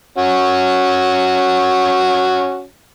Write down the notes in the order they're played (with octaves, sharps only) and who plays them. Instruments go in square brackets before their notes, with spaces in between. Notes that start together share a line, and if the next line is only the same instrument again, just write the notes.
[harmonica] C#4 F#4